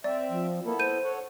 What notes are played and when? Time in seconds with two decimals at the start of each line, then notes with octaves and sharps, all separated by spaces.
0.04 C4 D5 E5
0.29 F3
0.65 A#3 B3 E4 A4
0.79 C5 G6 D#7
1.04 A4 C#5 F#5